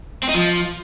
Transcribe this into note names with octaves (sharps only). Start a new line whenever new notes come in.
C4
D#4
F3